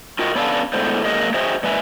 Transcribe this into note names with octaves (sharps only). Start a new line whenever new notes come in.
F4 F#4 A#4 D#5 G5
B3 C#4 D4 A4 F5
A2 D3 G#3 A3 B3 C5
F#3 G#3 A#3 G#4 A#4 D#5
F#4 G#4 C5 D#5 E5 G5
A#2 G#3 B4 E5 G#5